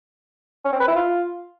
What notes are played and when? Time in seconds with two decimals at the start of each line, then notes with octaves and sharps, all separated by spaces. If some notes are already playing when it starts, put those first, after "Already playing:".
0.65 C#4
0.72 C4
0.80 B4
0.88 E4
0.96 F4